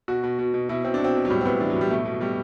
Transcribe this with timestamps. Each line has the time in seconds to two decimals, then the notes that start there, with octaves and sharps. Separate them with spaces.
0.08 B2 F#4
0.24 B2
0.39 B2
0.54 B2
0.69 B2 E4
0.84 B2 C4
0.94 D4
0.99 B2
1.04 C4
1.15 B2
1.25 F#3
1.30 A2 G3
1.41 C4
1.45 A2 B3
1.60 E3 D4
1.70 F#3
1.76 A2
1.81 G3
1.90 B2 A3
2.05 B2
2.20 B2 G3